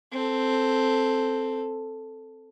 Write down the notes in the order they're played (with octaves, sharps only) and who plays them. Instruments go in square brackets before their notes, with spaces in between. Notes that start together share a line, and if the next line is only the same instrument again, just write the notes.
[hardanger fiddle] C4 A4